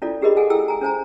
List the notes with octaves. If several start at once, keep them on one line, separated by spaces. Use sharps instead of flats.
C#4 E4 F4 A4 D5
D4 G4 G#4 A#4 D#5 B5
G#4 A4 F#5 G#5
E4 G#4 A4 G5 E6
G#5 A#5
C#4 C5 G#5 A#5